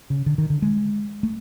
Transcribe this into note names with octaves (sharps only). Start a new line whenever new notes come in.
C#3
D3
D#3
D3
G#3
A3